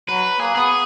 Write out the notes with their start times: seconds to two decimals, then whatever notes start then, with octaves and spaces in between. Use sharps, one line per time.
0.09 F#3 B4
0.40 A#3 G#4
0.55 B3 G#4